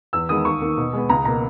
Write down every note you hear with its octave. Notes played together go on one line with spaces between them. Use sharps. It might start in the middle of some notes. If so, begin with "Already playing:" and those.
E2 E6
D#3 G#3 B3 D#6
D#2 C#6
D#3 A#3
B2
G#3 B3
C#2 A#5
B2 A#3 A#5